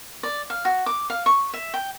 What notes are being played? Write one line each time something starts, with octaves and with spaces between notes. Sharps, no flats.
D5
F5
F#4
D6
F5
C#6
E5
G5